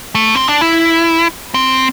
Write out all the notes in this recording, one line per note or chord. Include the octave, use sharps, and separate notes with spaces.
A3
C4
D4
E4
C4